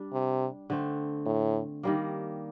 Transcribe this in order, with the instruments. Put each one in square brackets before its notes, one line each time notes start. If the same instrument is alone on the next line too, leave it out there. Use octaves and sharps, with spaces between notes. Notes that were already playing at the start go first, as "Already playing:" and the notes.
Already playing: [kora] G3 D4
[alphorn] C3
[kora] D3 A3 C4
[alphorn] A2
[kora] D#3 G3 A#3